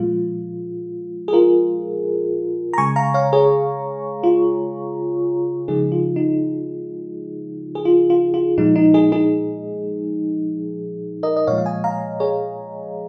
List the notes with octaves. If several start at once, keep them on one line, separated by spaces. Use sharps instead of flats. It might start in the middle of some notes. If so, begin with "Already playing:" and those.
Already playing: A#2 F3 G#3 F4
G#4
F4 A#4
A#5
C#3 G#3 G#5 C#6
F5 A#5
C#5 F5
G#4 C#5
F4
C#3 F3 G#3 D#4 G#4
F4
D#4
G#4
F4
F4
F4
A#2 F3 G#3 D#4
D#4
D#4 G#4
D#4 G#4
A#4 D#5
D#5
A#2 F3 G#3 C#5 F5
F5
D#5 G#5
F5 A#5
G#4 C#5